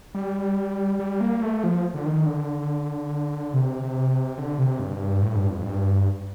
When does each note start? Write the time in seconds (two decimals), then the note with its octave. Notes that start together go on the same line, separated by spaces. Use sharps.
0.15 G3
1.00 G3
1.21 A#3
1.41 A3
1.64 F3
1.94 D3
2.06 D#3
2.26 D3
3.54 C3
4.38 D3
4.59 C3
4.80 G2
5.22 A2
5.36 G2
5.50 F2
5.64 G2